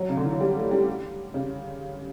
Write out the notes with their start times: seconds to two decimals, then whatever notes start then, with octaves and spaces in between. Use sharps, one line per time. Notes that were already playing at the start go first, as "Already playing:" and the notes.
Already playing: F#3
0.09 C#3
0.17 D3
0.25 E3
0.32 F#3
0.40 G3
0.56 A3
0.71 G3
1.34 C#3